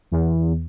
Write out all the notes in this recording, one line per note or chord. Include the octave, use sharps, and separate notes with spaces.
E2